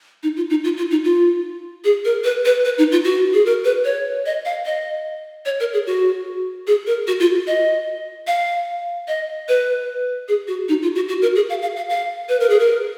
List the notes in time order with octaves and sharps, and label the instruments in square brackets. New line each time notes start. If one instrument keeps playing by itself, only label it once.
[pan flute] D#4
F4
D#4
F4
F4
D#4
F4
G#4
A#4
B4
B4
B4
D#4
F4
F#4
G#4
A#4
B4
C#5
D#5
F5
D#5
C#5
A#4
G#4
F#4
G#4
A#4
F#4
F4
D#5
F5
D#5
B4
G#4
F#4
D#4
F4
F#4
F#4
A#4
G#4
F5
F5
F5
F5
B4
A#4
G#4
A#4